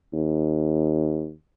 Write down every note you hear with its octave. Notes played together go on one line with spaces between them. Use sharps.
D#2